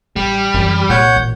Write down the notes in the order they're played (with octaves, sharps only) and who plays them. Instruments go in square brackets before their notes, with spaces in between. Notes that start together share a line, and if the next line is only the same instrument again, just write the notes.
[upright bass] A1 [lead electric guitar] G3
[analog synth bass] F#2 [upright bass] E3 C4
[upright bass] C2 G#3 [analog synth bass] A#2 [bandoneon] C#5 F#5 G6
[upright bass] A1